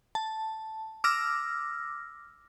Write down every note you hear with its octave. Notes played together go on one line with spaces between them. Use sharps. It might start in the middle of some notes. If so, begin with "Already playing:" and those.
A5
D6 E6 F6 A#6